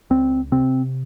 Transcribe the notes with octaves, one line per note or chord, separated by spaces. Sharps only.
C#2 C4
C3 C4